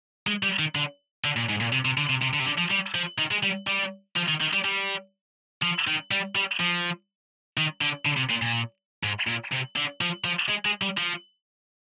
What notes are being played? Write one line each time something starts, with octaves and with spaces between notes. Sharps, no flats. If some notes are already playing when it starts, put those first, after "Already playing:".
G#3
G3
D#3
D3
D3
A#2
G#2
A#2
C3
C3
D3
C3
C3
D3
C3
D3
F3
G3
F3
D#3
G#3
G3
G3
F3
D#3
D#3
G3
G3
F3
D#3
G3
G3
F3
D#3
D3
D3
C3
A#2
A#2
G#2
A#2
C3
D3
F3
F3
G#3
G#3
G3
F3